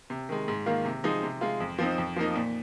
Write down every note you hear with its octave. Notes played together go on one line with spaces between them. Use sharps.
C3
D#3 G#3
G#2
D#3 A#3 F4
C3
F3 G#3 D#4
C3
G#3 F4
F2
F3 C4 D#4
F2
F3 A#3 D#4
A#2